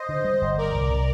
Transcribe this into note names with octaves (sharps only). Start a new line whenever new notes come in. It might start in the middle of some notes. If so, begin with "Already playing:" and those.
Already playing: C5 D#5
D3
G3
G1
G3 A#4 D5
C2
C3